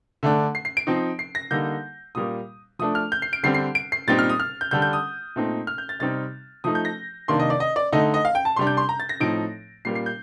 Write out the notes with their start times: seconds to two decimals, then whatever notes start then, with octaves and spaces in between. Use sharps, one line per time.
0.23 D3 A3 D4
0.55 C7
0.65 C7
0.77 D7
0.87 F3 C4 D#4
1.19 C7
1.35 A#6
1.51 D3 G3 A#3 D#4 G6
2.15 A#2 G3 A#3 D#6
2.79 F3 A3 D4 D#6
2.95 F6
3.12 G6
3.22 C7
3.33 D7
3.43 D3 G3 C4 C7
3.54 C7
3.75 D7
3.92 C7
4.07 A#2 G3 C4 D#4 A6
4.19 F6
4.30 D#6
4.40 F6
4.61 G6
4.71 D3 G3 D4 G6
4.82 G6
4.93 D#6
5.36 A#2 A3 C4 D#4
5.67 F6
5.78 G6
5.89 A6
6.00 C3 G3 C4 D#4 A6
6.64 F3 A3 D#4 D#6
6.75 G6
6.85 A#6
7.28 C3 D#3 A#3 D4 C6
7.40 D#5
7.50 D5
7.60 D#5
7.76 D5
7.92 D3 A3 D#4 D#5
8.14 D#5
8.25 F5
8.35 G5
8.45 A5
8.56 C3 G3 D4 C6
8.67 G6
8.77 C6
8.89 A#5
9.00 A6
9.09 A#6
9.20 A2 F3 C4 D#4 D7
9.85 A#2 G3 A#3 C7
9.95 C7
10.06 G6